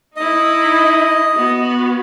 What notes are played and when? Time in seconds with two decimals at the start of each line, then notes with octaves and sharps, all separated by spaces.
0.16 D#4 E4 D#5
1.35 B3 F#4